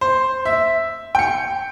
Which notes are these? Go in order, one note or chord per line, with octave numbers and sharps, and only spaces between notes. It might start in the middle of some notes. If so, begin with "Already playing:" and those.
C5
E5
G5 C#7